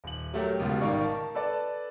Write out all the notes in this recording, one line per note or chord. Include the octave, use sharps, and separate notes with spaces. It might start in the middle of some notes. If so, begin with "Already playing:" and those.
D#1 F#7
F#3 A3 G4 A#4
C#2 B2 G3 F4
G#1 D#3 A#4 D5 F5 C#6
A5
A4 B4 D5 A5